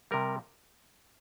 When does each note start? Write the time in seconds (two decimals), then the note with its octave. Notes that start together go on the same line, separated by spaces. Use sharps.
0.11 C3 G3 A#4